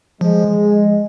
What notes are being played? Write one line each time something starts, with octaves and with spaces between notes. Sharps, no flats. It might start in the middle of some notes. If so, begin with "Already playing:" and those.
F3 G#3